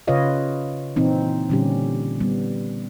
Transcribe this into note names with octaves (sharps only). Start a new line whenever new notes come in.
C#3 F4 B4 C#5 D#5 F5
A#2 E3 C4 D#4
A#2 D3 G3 C#4 G4
G3 B3